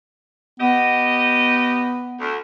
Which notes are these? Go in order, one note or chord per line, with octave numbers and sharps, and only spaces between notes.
B3 G4 D#5
D2